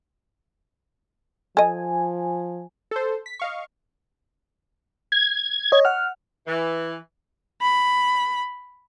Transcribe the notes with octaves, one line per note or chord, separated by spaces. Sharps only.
F3 A4 D#5 G#5
A4 C5
B6
D#5 F5 C#6
G#6
C#5 D#5
F#5 F6
E3
B5